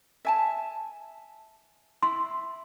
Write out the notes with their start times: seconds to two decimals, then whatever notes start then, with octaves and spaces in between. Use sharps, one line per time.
0.25 E5 G#5 A5
2.03 E4 C6